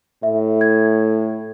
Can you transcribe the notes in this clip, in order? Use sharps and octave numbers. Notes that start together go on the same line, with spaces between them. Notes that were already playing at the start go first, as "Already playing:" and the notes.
A2 E5
G#6